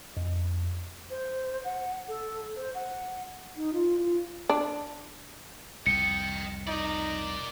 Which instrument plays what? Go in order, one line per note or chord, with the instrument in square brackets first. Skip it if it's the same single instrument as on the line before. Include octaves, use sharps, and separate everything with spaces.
[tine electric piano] F2
[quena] C5
F#5
A4
C5
F#5
[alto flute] D#4
F4
F4
[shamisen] D4
[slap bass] C2 F2 [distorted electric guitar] D#5 G5 [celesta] C#7
[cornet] D#4 [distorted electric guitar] A#4 D5